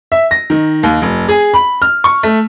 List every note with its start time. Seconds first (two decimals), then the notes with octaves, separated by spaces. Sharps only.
0.12 E5
0.31 A#6
0.50 D#3
0.83 D#2
1.02 F1
1.29 G#4
1.54 B5
1.82 F6
2.04 C#6
2.23 A3